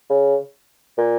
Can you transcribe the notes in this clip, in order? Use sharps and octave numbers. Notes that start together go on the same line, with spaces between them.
C#3
A#2